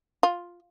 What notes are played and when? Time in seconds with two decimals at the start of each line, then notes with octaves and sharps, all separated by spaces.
0.23 F4